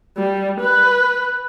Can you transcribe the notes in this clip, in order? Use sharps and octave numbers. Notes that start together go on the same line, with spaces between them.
G3
B4